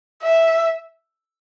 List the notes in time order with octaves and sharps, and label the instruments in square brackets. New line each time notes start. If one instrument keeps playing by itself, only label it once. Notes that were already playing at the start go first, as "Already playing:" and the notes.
[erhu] E5